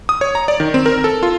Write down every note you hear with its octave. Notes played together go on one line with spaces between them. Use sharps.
D#6
C#5
A#5
D5
D#3
C4
A#4
A4
F4